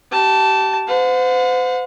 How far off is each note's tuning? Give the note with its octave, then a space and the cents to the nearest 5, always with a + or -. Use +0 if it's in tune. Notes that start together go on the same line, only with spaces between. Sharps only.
G4 -30 A5 +0
C5 -40 F#5 -40